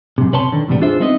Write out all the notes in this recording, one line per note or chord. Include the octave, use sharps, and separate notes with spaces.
F#2 C3
C3 B4 C#5 A5 C6
D3 D#3
E2 A2 C3 G3 B3
D4 F4 G#4 C5 E5
G3 B3 C4 D#4 B4 D#5